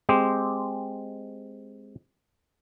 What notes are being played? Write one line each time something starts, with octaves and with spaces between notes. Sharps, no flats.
G#3 C4 G4